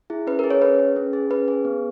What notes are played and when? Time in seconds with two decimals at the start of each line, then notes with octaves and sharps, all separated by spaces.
0.10 E4 G#4
0.27 C#4 B4
0.39 G#4 A#4
0.50 C#5
0.62 C#4 B4
0.79 G#4
0.96 C#4
1.13 G#4
1.30 C#4 B4
1.48 G#4
1.65 B3